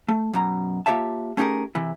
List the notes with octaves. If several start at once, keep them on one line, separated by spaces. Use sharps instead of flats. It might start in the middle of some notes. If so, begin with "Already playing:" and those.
A3
F#2 B2 A#5
A#3 F4 G4 C#5 E5 A5
A3 C#4 D#4 G4 G#4 A#4
C3 E3 E4